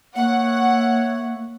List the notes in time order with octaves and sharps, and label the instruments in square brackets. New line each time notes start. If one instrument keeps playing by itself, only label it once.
[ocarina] A#3 [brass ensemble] C#5 E5 [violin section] F#5